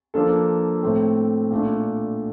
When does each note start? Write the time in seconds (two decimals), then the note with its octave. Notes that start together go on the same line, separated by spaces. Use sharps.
0.14 F3 A#3 D4 A4
0.83 A2 A3 C4
1.50 A#2 A3 D4